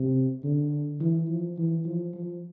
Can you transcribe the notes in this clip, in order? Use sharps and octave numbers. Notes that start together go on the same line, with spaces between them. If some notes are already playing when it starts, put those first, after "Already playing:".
Already playing: C3
D3
E3
F3
E3
F3
F3